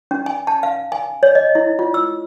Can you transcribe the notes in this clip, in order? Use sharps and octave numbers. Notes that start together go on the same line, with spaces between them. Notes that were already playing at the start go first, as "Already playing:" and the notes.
C#4
G#5
A5
F5
G#5
C#5
D#5
E4
F4
E6